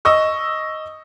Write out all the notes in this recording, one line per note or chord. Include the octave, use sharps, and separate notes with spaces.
D#5 C#6 E6